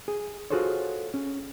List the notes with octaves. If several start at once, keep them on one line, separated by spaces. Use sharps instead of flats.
G#4
F4 F#4 G#4 A4 C5 C#5
C#4